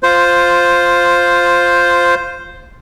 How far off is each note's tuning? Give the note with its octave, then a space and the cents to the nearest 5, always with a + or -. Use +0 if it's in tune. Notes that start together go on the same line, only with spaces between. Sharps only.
F4 +5 C5 +0